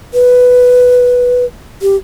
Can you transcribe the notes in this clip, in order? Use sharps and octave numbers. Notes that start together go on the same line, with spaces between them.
B4
G4